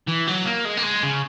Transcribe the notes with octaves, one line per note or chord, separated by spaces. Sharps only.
E3
F#3
A#3
G#3
A#3
G#3
C#3